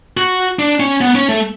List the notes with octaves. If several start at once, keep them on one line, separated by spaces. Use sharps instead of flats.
F#4
D4
C#4
B3
C#4
A3